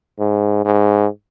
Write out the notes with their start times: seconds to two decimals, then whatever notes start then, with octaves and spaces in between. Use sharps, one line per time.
0.19 G#2
0.65 G#2